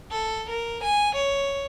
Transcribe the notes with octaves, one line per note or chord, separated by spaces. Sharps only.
A4
A#4
G#5
C#5